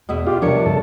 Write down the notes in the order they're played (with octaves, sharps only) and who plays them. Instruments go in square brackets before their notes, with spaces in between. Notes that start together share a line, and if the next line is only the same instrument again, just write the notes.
[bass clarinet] E2 [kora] B2 B3 E5
[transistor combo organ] F4 [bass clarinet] G4
[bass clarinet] C3 [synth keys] F3 A#4 C#7 [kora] G3 C#5 [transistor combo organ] D4
[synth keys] G2 C#3 [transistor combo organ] A4